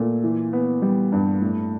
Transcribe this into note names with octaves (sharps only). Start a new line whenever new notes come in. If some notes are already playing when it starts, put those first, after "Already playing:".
Already playing: A#2 A3
E3
B3
G3
G2
A2